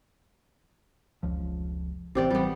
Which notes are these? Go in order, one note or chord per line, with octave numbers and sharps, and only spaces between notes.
F1 C#2 F3
A1 C3 E3 G4 D5
G3 B3